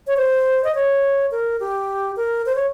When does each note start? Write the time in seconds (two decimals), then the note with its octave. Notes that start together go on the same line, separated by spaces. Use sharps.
0.07 C#5
0.17 C5
0.64 D#5
0.75 C#5
1.31 A#4
1.60 G4
2.17 A#4
2.46 C5
2.55 C#5